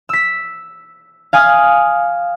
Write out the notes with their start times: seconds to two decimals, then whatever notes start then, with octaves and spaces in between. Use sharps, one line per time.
0.09 E6 B6
1.33 F5 G#5 D#6